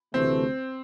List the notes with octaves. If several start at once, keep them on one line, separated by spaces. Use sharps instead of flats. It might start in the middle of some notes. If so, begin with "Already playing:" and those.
D2 C3 E3 A3 C4